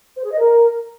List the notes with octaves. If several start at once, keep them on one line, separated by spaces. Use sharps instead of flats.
C5
G#4
D#5
A#4